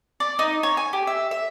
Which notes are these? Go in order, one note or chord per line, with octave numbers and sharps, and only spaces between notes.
D5
D#4
C#5
G#5
G4
E5
E5